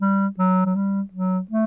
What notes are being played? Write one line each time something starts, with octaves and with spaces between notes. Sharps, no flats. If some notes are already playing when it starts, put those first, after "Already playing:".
G3
F#3
F#3
G3
F#3
A3